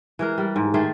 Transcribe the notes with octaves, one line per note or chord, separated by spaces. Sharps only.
E3 G#3 A#4
G3
G#2
D#3 A3 G#4 C5